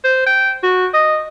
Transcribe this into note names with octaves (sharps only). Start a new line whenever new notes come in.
C5
G5
F#4
D#5